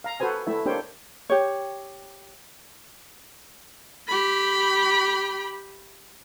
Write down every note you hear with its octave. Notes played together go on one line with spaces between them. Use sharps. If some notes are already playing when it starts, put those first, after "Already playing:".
F5 A#5
F#4 A4 B4 C5 G#5
A3 E4 E5
A#3 D4 G4 C5 C#5 G5
G4 C#5
G4 B5